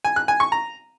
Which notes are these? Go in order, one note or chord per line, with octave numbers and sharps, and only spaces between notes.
G#5
F#6
G#5
C#6
A#5